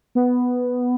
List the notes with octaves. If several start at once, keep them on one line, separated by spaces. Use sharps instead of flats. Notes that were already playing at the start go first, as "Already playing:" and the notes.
B3